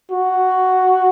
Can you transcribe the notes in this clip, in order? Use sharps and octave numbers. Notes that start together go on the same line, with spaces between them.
F#4